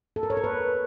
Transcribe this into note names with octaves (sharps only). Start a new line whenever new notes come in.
A4
A#4
C#5
A#4
B4